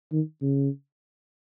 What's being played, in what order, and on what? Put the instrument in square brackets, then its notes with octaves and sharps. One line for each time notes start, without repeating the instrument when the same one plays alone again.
[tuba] D#3
C#3